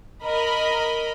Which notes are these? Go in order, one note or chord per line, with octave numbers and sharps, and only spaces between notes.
A#4 D#5 B5